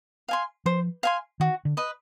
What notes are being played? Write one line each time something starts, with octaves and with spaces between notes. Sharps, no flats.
F5 G#5 C6
F3 C5
F5 G#5 C6
D#3 F#4
D3
B4 D#5